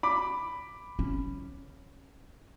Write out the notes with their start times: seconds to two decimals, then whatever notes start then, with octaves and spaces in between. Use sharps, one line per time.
0.03 B5 D6
0.99 C#4